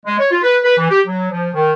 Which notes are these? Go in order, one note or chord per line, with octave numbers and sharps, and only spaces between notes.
G#3
C#5
F4
B4
B4
E3
G4
F#3
F3
D#3